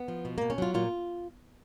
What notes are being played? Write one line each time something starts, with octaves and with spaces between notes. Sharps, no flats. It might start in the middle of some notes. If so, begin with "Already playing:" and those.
Already playing: B3
F3
B2
B2 A#3
C#4
F#3 F4
A#2 F4